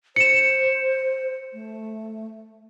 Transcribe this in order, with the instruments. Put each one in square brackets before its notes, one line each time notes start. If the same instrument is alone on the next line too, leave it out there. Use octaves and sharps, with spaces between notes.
[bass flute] C5 [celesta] C#7 E7
[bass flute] A3